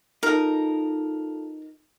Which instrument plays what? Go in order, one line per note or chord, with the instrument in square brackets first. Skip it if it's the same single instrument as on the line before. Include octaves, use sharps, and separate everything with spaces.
[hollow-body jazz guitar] D#4 [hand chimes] F4 A4 A5 [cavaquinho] A#4